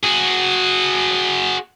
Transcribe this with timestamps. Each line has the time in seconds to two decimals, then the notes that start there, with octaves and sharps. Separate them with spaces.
0.04 F#4 G#4